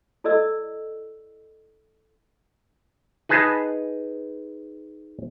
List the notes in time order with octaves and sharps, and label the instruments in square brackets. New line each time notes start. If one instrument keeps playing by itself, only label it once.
[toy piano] E4 A4 D5 D#5 E6
[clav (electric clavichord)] D#4 G#4 B4 A5